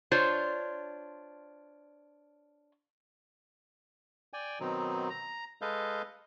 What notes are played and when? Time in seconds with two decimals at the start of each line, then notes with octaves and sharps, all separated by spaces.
0.11 D4 F4 C5 C#5
4.33 D5 G5 G#5
4.60 B2 D#3 F#3 C4 D#4
5.10 A#5
5.62 G#3 A4 B4 D#5 F5 G6